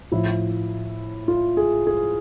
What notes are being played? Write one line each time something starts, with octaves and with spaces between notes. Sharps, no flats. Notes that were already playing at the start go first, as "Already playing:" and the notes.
A2 F3 E4
F4
G#4
G#4